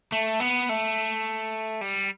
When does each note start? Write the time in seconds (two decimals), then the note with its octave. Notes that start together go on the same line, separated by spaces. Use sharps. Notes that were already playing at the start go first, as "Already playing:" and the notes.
0.12 A3
0.40 B3
0.69 A3
1.81 G3